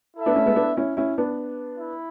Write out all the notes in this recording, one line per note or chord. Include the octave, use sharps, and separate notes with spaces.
E4 A4 E5
B3 D4
A3 C#4
G#3 B3
B3 D4
C#4 E4
C#4 E4
B3 D4
E4